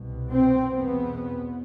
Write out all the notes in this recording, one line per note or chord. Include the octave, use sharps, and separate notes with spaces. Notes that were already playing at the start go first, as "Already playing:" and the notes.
Already playing: C2 B2
C4
E2 B2 B3